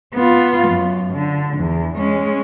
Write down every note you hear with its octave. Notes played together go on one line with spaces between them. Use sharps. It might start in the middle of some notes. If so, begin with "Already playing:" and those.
B3 F4
F#2
D3
E2
G#3 C#4